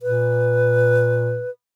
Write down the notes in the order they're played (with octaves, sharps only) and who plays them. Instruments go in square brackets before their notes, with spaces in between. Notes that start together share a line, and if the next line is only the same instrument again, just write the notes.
[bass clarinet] A#2 [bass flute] B4